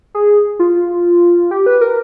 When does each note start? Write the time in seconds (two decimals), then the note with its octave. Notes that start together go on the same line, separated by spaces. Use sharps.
0.14 G#4
0.59 F4
1.51 G4
1.66 B4
1.81 A#4